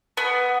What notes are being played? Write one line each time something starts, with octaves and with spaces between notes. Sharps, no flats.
B3